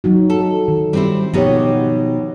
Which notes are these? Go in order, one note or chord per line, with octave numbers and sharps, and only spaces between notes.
F#3 D#4 F#4
A4
D#3
G3 C4 E4
B2 F3 D#4 G4 C#5 F#5